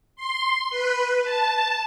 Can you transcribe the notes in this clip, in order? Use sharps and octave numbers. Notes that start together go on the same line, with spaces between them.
C6
B4
A5